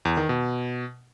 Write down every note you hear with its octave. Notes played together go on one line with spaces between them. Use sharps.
E2
D#3
B2